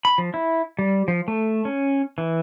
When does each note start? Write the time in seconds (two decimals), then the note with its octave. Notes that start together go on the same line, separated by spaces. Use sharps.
0.05 B5
0.18 F3
0.34 E4
0.79 G3
1.08 F3
1.28 A3
1.65 C#4
2.18 E3